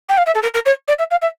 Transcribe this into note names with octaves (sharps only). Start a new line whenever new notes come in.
G5
F5
E5
A4
A#4
A#4
C#5
D5
E5
F5
E5